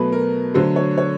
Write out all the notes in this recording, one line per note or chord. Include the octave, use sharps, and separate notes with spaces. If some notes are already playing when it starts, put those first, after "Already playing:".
Already playing: B2 F#3 A3 B4
A#4
D3 F#3 A3 C5
C#5
C#5